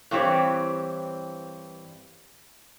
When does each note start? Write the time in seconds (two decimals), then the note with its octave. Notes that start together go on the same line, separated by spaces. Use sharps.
0.11 G2 E3 C4 G4 C#5